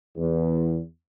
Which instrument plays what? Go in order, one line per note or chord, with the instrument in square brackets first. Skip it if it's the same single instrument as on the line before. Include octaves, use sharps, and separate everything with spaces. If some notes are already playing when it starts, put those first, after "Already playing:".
[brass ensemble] E2